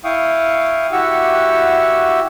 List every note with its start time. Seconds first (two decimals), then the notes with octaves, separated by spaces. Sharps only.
0.04 E4 F5 G5 C#6 D#6
0.92 E4 F#4 G4 F#5 C#6 E6